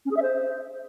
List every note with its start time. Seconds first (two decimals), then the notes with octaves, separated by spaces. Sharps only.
0.05 C#4
0.11 G#4
0.17 E5
0.22 C5